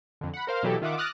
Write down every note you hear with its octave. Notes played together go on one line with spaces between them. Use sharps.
F2 D3
F#5 B5
A#4 C5 F5
B2 E3 F#3 E4 G4 A4
D#3 F4 E5 F#5 D6
D6 D#6 F6 F#6 A6 A#6